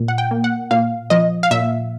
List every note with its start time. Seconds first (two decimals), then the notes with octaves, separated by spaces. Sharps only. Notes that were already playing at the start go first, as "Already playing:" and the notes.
Already playing: A#2
0.08 F#5
0.18 G5
0.31 A#3
0.44 F#5
0.71 A#2 F5
1.10 F3 D#5
1.43 F5
1.51 A#2 E5